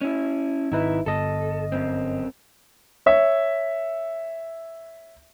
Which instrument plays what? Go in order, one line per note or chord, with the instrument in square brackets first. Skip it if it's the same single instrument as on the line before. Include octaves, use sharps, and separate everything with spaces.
[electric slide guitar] C#4 E4
[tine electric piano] G#1 D#4 B4 [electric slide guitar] E4
[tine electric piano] G1 D#5 [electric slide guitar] A4
[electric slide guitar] F#2 C4
[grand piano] C#5 E5